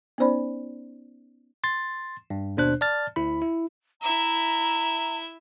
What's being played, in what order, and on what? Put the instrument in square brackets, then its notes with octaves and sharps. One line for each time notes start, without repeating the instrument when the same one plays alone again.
[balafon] B3 C#4 D#4 C5 D5 B5
[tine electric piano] C6 A6
G2
D#2 B2 D4 C5 F#6
D5 A5 F6 A6
D2 E4 B5
E4
[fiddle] E4 E5 [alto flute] A#5